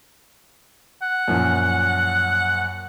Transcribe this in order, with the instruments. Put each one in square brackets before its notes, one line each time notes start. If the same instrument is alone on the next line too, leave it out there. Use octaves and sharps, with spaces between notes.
[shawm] F#5
[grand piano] F#2 A#2 F3